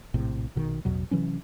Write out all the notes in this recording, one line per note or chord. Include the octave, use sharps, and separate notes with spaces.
A#1 A2 C3
A#1 B2 D#3
A1 E2 B2 F#3
C3 E3 F#3 C#4